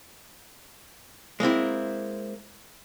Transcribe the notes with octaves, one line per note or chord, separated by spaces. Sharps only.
G#3 A#3 C4 E4